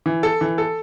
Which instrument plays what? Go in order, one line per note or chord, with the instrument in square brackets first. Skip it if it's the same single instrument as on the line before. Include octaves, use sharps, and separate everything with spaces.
[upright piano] E3
A4
E3
A4